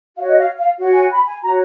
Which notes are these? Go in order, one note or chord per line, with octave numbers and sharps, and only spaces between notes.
F#4 C#5 F5
D#5
F5
F5
F#4 C#5 F#5
G#5
B5
G#5
F#4 C#5 A#5